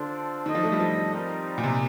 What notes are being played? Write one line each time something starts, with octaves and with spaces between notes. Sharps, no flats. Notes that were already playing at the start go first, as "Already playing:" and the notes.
Already playing: D3 D4 F4 A4 C5
D#3 D4 A4 D#5
F3
A3
G3
F3
G3 C4 D#4 A#4
A#2
C3